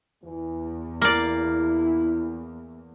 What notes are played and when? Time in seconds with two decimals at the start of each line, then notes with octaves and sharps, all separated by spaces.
0.24 E2 E3
1.02 A#3 E4 D5